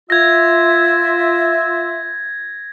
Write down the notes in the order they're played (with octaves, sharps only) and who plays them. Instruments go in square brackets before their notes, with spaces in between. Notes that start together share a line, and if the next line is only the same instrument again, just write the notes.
[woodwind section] F4 E5 [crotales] G#6 A#6